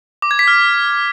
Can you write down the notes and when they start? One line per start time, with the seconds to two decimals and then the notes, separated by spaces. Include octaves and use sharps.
0.22 D6
0.31 G#6
0.39 B6
0.48 F6